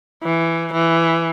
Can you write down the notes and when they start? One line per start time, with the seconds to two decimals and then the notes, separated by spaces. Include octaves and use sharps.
0.23 E3
0.73 E3